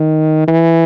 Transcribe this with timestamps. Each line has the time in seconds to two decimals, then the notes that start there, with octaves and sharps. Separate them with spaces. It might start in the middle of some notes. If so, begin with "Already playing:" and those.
Already playing: D#3
0.48 E3